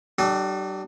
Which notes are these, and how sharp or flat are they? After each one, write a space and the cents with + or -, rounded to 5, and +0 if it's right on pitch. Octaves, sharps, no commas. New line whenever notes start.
G3 -35 D4 +35 A4 -35